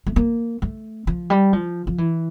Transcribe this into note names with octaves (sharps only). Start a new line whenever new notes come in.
A3
A#3
A3
F3
G3
F3
F3
E3